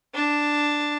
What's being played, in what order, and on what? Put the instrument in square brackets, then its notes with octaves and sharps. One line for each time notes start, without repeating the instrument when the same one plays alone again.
[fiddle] D4